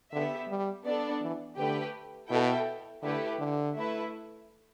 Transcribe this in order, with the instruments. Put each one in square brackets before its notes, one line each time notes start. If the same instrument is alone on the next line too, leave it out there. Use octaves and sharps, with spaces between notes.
[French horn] D3 [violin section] B3 G4 E5
[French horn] G3
[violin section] B3 D4 A4 D5
[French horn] E3
[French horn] D3 [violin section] A3 G4 B4 G5
[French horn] B2 [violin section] E4 A4 E5 G5
[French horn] D3 [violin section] A3 E4 G4 B4
[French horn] D3
[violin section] A3 E4 B4 E5